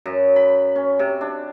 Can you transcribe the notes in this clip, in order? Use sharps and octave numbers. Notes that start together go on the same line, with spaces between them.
F#2
B5
C#4
C3
D4